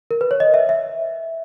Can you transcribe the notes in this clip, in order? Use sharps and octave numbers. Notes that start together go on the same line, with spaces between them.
A#4
B4
C#5
D#5
E5
E5